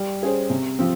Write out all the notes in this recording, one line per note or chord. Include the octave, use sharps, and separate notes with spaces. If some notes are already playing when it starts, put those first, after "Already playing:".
Already playing: G3
C#4 G#4 C5
C3
F3 C4